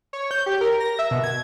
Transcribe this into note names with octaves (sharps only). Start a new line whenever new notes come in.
C#5
G6
G4
A#4
A#6
E5
B2
G#6